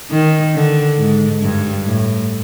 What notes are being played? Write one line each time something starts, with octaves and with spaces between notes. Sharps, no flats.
D#3
D3
G#2
G2
A2